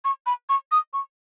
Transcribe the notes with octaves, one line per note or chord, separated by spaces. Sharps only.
C#6
B5
C#6
D#6
C#6